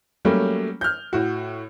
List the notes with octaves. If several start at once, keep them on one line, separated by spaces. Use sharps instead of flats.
F#3 G3 A3 A#3 C#4
F6 G6
A2 F#4